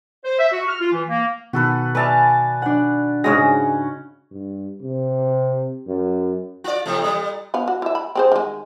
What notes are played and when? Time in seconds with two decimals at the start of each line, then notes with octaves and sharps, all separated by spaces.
0.24 C5
0.39 E5
0.52 F#4
0.68 F6
0.80 F4
0.92 E3
1.08 A#3
1.53 B2 D#3 F#4 A4 B4
1.95 B4 D5 E5 F5 G#5 A5
2.62 D4 F#5
3.24 G#2 C#3 G#3 C#4 F#4 A#6
4.31 G2
4.82 C3
5.88 F#2
6.64 F4 D5
6.86 E2 C3 A3
7.02 A#2 G3
7.54 B3 B4 F5
7.68 F#4
7.82 E4 E5
7.95 B5
8.15 C4 G#4 C5
8.32 D#3 G#3